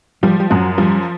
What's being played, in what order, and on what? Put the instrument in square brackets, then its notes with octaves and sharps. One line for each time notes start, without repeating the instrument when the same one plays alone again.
[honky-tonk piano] F3 [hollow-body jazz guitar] G3
[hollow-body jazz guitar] G3
[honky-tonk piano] F#2 [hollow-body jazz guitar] F#3
[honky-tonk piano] F3 [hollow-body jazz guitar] G3